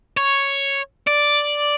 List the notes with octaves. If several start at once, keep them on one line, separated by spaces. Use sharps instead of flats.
C#5
D5